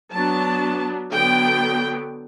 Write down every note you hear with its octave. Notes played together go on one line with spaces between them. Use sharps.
F#3 B3 D4 A5
D3 F#3 B3 G5